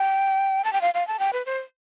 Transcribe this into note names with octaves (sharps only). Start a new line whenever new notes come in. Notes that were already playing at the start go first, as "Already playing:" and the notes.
Already playing: G5
A5
G5
F5
F5
A5
G5
B4
C5